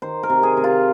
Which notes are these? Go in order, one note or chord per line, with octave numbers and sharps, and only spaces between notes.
D#3 C5
A#4
C3
G#4
C3
F4